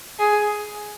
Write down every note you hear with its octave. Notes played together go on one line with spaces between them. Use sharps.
G#4